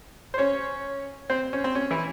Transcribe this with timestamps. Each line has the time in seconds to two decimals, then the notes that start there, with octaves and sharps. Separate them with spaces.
0.34 C5
0.38 C#4 C#5
1.30 C4 C5
1.53 C#4
1.64 C4
1.75 C#4
1.91 E3 E4